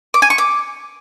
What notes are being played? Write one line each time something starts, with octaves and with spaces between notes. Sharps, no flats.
D6
G#5
C#6
D6